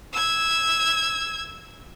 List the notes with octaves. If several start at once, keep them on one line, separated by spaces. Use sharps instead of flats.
E6 G#6